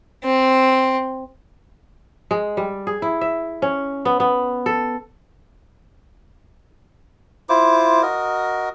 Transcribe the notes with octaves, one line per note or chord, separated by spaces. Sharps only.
C4
G#3
G3
G#4
E4
E5
C#4
B3
B3
A4
E4 F4 C5 D6
F#4 A#4 D#5